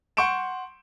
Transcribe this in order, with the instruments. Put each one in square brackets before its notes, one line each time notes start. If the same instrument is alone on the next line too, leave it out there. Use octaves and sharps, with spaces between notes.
[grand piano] F#5 C6 C#6 G6 D7 E7